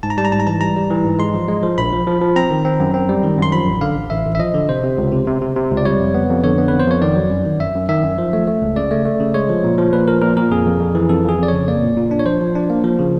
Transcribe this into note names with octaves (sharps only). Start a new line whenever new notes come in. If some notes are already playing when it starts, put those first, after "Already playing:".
G#2 A5
A#5
G3 A5
A#5
G#2 A5
A#5
E3 A5
G3 A#5
G3
E3
G#2
G#3 C6
F3
G#3
F3
A#1 B5
F3
F3
F3
C4 A#5
D#3
C4
F#2
C4
G3
D#3
F#2 C6
F3 B5
A1
D3 F5
A1
A1 E5
A1
E5
F3 D#5
D3
C3 C5
C3
C#2
C3
C3
C3
C3
C#2
D5
G3 C#5
F2
B3
F2
D3 C#5
B3
F2 B4
C5
F2 C#5
D#3 D5
F#3
F#2
D#3
F#2 E5
F#2
D#3 E5
F#2
F3
A3
A3
C#2
C#3 D5
A3
A3
C#3
G#3 C#5
F3
A#2
F3
A#2 B4
F3 A#4
A#2 A#4
A#2 A#4
F2 G#4
F2
F2
E3
F2 A4
F2 G#4
F2 D5
C#3 C#5
A#3 D5
A#2
A#2
D4
C#5
F3 C5
F3
D4
A#3
F3
C#3